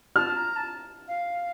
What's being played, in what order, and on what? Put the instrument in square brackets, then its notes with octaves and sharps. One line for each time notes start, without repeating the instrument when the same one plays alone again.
[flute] A5 [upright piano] F6
[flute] A#5
A5
F5